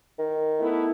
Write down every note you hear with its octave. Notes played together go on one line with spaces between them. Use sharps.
D#3
A3 B3 E4